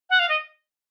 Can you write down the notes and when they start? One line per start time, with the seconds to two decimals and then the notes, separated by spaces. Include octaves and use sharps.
0.10 F#5
0.19 F5
0.29 D#5